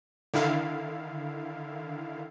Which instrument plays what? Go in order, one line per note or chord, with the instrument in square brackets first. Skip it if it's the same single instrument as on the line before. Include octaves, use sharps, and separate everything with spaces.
[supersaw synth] D3 D#3 E4 F5